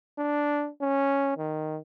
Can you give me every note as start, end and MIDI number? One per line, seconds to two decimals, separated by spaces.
0.19 0.69 62
0.82 1.35 61
1.38 1.78 51